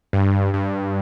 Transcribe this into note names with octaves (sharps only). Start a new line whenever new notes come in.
G2
G2